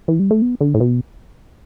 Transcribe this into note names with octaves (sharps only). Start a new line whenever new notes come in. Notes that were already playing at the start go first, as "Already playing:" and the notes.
E3
G3
A3
B3
D3
A2
B2